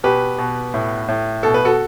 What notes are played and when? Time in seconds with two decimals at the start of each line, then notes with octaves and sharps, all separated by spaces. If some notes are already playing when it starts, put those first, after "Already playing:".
0.04 B2 G4 B4
0.38 B2
0.74 A2
1.08 A2
1.43 B2 A4
1.54 B4
1.65 F#4 A4